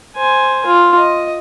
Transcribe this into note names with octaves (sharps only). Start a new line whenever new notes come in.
C5 G#5
F4
D#5